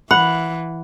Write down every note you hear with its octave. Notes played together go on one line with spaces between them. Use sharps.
E3 F#5 B5